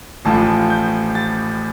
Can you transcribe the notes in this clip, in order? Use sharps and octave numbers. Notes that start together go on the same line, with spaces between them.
A1 A2 F3 A5
G6
A6